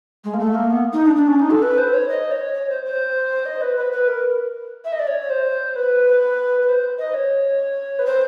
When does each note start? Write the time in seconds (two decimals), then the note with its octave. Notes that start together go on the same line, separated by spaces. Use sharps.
0.24 G#3
0.34 A#3
0.39 A3
0.54 A#3
0.70 B3
0.93 D#4
1.05 D4
1.16 D4
1.28 C#4
1.40 D#4
1.50 A4
1.62 B4
1.78 C5
1.93 C#5
2.09 D#5
2.31 C#5
2.54 C#5
2.69 C5
2.85 C5
3.46 D#5
3.61 B4
3.77 B4
3.92 B4
4.08 A#4
4.85 E5
4.92 D#5
4.99 D5
5.07 C#5
5.30 C5
5.76 B4
6.62 B4
6.69 C5
6.99 D#5
7.14 C#5
7.99 B4
8.06 C5